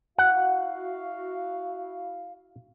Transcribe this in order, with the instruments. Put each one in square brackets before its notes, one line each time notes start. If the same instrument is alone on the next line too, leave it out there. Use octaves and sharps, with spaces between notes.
[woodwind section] E4 F#4 F5 [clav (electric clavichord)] F#5